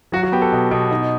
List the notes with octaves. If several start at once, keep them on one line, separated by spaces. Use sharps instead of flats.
F#3 F#4
F#4
B3 G4
A4
B2
B2
D#4